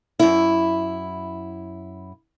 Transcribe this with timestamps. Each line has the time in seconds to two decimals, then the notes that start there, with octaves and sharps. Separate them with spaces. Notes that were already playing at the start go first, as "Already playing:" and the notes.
0.19 F#2 E4